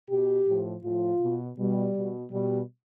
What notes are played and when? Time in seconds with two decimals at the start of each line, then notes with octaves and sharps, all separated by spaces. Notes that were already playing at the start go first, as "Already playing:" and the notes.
0.10 B2 G4
0.47 A2 F3
0.84 A2 F3 F4
1.21 B2
1.57 B2 G3
1.96 B2
2.32 B2 G3